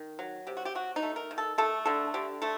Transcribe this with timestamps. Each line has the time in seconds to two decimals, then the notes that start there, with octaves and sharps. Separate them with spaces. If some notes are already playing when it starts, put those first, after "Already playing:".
Already playing: D#3
0.19 F#3
0.47 C3 G4
0.57 F#4
0.65 G4
0.75 F#3 F#4
0.96 D#4
1.03 A3
1.16 A#4
1.31 D#3
1.38 A4
1.58 A3 A4
1.86 D3 A4
2.14 D3 G4
2.42 A3 A4